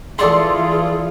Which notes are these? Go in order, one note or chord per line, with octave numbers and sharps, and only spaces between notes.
E3 F4 G#4 A4 D5 C6